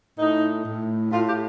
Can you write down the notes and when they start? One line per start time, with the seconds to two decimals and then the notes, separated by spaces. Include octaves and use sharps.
0.19 A2 D#4
0.66 A2
1.11 A2 F4
1.27 G4